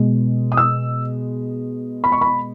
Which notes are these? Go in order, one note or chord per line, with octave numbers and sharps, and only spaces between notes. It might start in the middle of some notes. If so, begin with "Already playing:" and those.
Already playing: B2 G#3
D#6
E6
B5
C#6
B5